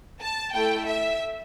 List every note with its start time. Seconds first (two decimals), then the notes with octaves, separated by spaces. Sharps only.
0.21 A5
0.54 A3 E4 A4 G5
0.87 E5